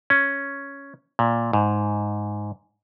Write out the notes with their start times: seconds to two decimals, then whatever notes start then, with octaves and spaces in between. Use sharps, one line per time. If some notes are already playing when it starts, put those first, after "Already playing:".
0.10 C#4
1.19 A#2
1.53 G#2